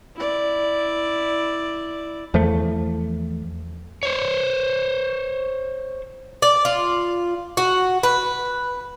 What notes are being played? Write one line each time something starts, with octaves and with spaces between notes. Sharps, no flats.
E4 D5
E2 F3 A3
C5 C#5
D5
F4
F#4
B4